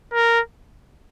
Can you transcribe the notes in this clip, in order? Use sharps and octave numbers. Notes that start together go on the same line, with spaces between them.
A#4